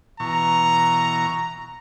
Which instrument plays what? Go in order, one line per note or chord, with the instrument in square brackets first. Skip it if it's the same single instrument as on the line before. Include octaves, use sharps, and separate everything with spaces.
[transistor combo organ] B2 E3 C#6 [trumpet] A#5